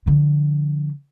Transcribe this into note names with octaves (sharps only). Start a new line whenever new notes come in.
D3 F3